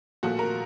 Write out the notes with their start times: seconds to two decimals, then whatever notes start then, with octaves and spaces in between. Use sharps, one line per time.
0.23 A#2 F3 A3 F#4
0.39 A#4